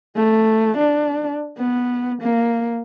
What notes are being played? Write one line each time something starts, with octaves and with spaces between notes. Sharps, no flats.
A3
D4
B3
A#3